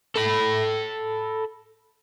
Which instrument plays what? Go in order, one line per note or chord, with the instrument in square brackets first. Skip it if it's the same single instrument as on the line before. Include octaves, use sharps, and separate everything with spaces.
[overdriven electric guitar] A4 B5